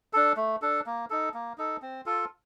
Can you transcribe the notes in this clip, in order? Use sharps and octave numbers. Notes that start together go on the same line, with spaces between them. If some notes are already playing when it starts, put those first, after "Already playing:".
D4 A4
A3
D4 A4
A#3
D#4 A4
A#3
D#4 A4
C4
F4 A4